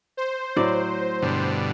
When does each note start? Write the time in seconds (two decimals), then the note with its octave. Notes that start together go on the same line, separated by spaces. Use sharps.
0.17 C5
0.56 A2 F#3 D5
1.22 G2 B2 D3